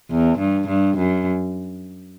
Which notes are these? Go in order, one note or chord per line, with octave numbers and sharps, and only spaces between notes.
E2
G2
G2
F#2